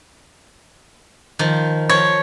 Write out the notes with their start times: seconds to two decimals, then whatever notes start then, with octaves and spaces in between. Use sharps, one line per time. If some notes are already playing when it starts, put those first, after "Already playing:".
1.39 D#3 F3
1.89 F3 C#5